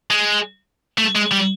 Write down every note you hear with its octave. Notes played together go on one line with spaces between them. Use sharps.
G#3
A3
G#3
G3